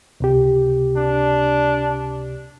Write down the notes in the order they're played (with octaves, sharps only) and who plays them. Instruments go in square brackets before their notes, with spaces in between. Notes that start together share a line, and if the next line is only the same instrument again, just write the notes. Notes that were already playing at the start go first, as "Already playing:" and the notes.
[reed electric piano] C#2 C3 G4
[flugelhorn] D4